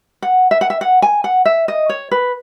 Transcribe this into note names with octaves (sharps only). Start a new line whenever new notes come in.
F#5
E5
F#5
E5
F#5
G#5
F#5
E5
D#5
C#5
B4